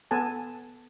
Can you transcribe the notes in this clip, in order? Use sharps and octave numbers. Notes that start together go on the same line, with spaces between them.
B3 A4 G#5 A5